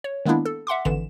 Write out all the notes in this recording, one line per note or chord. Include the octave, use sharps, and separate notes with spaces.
C#5
D#3 G#3 A#3 B3 D4 E4
A4
E5 F#5 C6 D6
G#1 D3 E3 E7